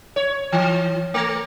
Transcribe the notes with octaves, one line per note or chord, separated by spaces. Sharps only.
C#5
E3
A3